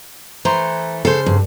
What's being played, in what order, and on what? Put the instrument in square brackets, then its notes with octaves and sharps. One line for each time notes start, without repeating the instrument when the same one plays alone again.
[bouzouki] E3 A3 C5 [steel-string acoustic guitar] A#5
[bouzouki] C#3 C5 [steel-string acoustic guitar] A4
[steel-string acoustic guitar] G2